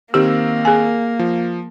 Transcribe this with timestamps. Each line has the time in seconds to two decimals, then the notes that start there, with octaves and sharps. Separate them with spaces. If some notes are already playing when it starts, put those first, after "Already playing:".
0.14 D#3 A#3 C4 G4 E6
0.65 G#4 G#5
1.19 F3